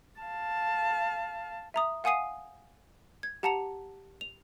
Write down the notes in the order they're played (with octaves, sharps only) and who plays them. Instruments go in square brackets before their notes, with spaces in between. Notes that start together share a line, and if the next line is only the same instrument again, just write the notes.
[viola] F5 A5
[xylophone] E5 A#5 D#6
F5 F#5 G#5 D#6 C7 D#7
G#6
G4 F#5 A5 A#5 C#7 F7
F7